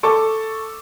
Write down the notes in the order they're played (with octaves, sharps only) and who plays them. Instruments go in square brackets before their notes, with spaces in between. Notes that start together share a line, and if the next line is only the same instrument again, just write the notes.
[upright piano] A4 C#6 D6